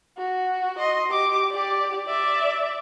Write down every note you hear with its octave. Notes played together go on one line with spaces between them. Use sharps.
F#4
D#5 C6
G4 D6
G4 D5
D5 E5